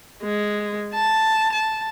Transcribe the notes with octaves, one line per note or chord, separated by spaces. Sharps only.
G#3
A5
A5